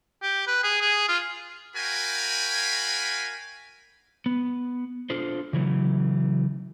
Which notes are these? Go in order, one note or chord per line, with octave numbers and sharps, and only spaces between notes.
G4
B4
G#4
G#4
F4
F#4 A#4 F5 G5 G#5 B5
B3
D4 F4 A4 C5
C#3 E3 F#3 A3